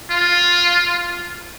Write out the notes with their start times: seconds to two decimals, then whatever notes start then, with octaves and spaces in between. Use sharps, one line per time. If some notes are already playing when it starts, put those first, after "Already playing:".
0.10 F4